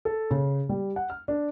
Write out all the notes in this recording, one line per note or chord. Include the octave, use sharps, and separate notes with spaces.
A4
C#3
G3
F#5
F6
D4